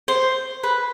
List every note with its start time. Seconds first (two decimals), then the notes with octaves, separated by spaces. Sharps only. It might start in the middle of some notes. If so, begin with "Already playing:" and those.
0.08 C5
0.63 B4